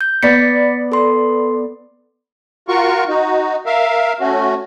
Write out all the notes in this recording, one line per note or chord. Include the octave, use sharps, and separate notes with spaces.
G6
B3 D5 A6 B6 C#7
A4 C6
F4 F#4 A#4 C#6
D#4 F#4
A#4 E5 F5
A3 C#4 F#4